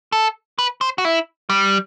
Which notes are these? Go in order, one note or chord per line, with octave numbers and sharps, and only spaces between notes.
A4
B4
C5
F#4
E4
G3